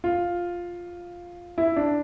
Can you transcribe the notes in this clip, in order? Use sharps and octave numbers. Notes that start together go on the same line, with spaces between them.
F4
E4
D4